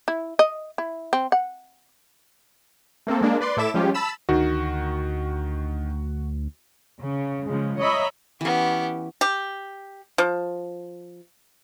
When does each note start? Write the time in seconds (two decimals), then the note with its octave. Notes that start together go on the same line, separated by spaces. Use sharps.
0.08 E4
0.39 D#5
0.78 E4
1.13 C4
1.32 F#5
3.07 A3 A#3 C4 A4
3.21 G#3 A#3 D4
3.41 B4 D5 C6
3.57 A2 E4 A4 E5 D6 E7
3.74 F3 G3 G#3 C#4 F4 G4
3.94 A5 B5 E6 E7
4.29 D2 D#3 F#4
7.00 C#3
7.46 C#3 F3 G#3
7.78 C#5 D#5 E5 A#5 B5
8.41 E3 B3 C#4 G4
9.21 G4
10.18 F3